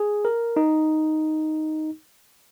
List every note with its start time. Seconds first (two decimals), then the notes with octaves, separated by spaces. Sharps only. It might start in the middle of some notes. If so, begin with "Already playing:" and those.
Already playing: G#4
0.25 A#4
0.56 D#4